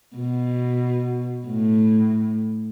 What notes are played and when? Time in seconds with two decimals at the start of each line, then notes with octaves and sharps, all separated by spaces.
0.17 B2
1.46 A2